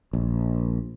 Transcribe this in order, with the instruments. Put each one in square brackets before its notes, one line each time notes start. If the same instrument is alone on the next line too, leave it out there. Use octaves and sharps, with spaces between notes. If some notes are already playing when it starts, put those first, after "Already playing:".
[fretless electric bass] A#1